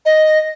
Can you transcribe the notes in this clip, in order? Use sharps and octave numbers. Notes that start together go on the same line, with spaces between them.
D#5